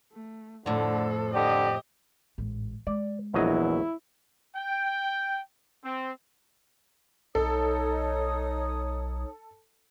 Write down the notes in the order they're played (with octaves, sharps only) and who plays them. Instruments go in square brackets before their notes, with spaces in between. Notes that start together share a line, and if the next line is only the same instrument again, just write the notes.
[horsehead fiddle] A3
[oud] F2 A2 [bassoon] D3 [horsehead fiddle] A4
[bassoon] D3 [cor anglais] G4 [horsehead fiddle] D#5
[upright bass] A1 G#2
[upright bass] G#3 [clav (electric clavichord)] D5
[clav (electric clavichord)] A#1 F#3 D#5 [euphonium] E2 [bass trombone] E4
[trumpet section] G5
C4
[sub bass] B1 [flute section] D#4 C#5 D#6 [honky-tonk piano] A4